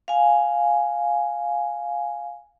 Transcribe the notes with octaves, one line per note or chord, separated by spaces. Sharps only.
F5 G#5